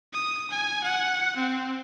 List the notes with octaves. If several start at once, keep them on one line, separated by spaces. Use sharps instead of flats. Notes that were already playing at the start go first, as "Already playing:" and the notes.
D#6
G#5
F#5
C4